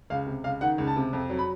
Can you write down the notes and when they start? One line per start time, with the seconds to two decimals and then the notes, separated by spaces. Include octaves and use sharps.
0.10 C#2 F5
0.27 C3
0.44 C#2 F5
0.61 D#3 F#5
0.78 C#2
0.87 A5
0.97 C3
1.13 F2
1.30 F#3
1.39 B5